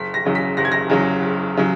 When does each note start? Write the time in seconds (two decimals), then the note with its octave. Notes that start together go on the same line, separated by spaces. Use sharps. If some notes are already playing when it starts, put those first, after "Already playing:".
Already playing: F#1 B6
0.14 A#6
0.25 E2 C#3 F#3
0.35 B6
0.57 F#1 A#6
0.65 G#6
0.72 A#6
0.90 E2 C#3 F#3
1.22 F#1
1.57 C#3 F#3